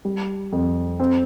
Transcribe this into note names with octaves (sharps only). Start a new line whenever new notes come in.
G3
F2
C4